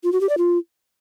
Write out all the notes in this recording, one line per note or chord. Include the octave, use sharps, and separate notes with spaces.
F4
F#4
G4
D5
F4